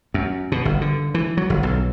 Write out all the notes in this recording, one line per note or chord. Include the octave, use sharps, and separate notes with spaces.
F#2
B2
G1
D3
E3
F#3
G1
B1